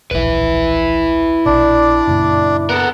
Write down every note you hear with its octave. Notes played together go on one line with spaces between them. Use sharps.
D1 A#1 E4 B4
A#1 B2 D4 D5
F#2 A#2 C#3
B3 A4 A#4 F#5